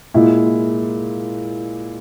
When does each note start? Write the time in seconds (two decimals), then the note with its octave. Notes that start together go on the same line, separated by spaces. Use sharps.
0.14 A#2 G#3 E4